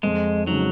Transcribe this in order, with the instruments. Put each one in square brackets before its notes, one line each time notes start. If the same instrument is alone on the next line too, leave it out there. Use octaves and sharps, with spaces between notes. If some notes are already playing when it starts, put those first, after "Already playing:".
[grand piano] F2 [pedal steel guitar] G#3
[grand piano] C#3 G#3 D#4 [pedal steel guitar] F#3